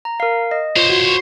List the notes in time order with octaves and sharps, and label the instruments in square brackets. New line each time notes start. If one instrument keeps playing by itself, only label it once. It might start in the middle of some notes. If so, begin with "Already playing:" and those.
[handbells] A#5
A#4 F5
D#5
[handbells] F4 [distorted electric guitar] C5 C#5
[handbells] F#4